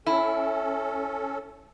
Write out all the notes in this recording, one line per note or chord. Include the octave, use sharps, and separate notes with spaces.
C#4 E4 A4